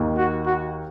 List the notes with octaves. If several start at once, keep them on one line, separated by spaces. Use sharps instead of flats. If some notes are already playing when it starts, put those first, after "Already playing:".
Already playing: D#2 D#3 A#3 D#4
F#4
F#4